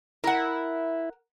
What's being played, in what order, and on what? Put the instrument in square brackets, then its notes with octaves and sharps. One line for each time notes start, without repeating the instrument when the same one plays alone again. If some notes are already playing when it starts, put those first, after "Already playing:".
[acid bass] E4 [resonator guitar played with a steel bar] A#4 F#5